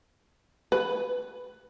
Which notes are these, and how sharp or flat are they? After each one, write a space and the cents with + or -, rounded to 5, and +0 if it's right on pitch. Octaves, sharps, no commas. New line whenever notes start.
B4 +0